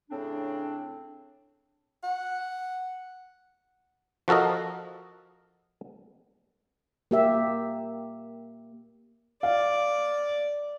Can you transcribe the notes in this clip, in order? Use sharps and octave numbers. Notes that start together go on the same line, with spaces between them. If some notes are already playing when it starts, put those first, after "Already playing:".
A2 C#3 C4 D4
F#5
F3 F#4 A4 A#4 D#5
A#3 G4 E5
D5 F5